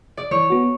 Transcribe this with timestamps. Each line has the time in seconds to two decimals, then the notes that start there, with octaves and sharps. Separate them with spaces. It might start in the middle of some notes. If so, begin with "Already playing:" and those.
0.17 D5
0.31 E3 C#5
0.50 B3 F#4